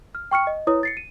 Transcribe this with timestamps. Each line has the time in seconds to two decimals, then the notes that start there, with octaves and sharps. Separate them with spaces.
0.15 F6
0.31 G5 C#6 F6 C#7
0.47 D#5
0.67 E4 B4 C#5 D#6
0.83 A6 C7 C#7
0.97 D#7